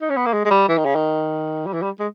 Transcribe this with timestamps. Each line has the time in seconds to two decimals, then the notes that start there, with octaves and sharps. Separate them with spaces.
0.01 D#4
0.10 C#4
0.17 B3
0.26 A#3
0.33 G#3
0.45 G#3
0.51 G3
0.69 E3
0.77 D#3
0.85 C#3
0.95 D#3
1.66 G3
1.73 E3
1.82 G3
1.99 G#3